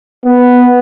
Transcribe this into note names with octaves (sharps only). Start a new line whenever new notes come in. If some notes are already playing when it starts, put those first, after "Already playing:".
B3